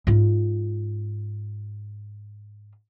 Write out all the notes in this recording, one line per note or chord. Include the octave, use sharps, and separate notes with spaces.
G#2 F4